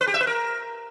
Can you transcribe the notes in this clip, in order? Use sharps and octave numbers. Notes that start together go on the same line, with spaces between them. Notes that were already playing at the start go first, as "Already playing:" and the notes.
B4
G4
E5
B4
A#4